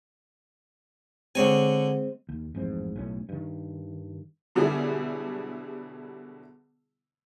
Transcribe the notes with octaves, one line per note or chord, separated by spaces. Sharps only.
D3 G#3 C4 C#5 G#5
D#2
A1 F2 G#2 C4
B1 A2 C#4
G2 D#3
B2 D3 F#3 G3 E4 G#4